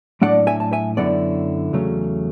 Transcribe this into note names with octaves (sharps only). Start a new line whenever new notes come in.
A2 F#3 A3 D4 D5 F#5
E5 G#5
A5
E5 G#5
F#2 D3 F#3 B3 E4 D5 F#5
E2 C#3 F#3 A3 C#4